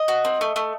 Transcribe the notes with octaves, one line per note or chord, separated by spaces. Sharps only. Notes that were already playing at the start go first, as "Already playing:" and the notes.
Already playing: D#5
F#4
C4
A3
A3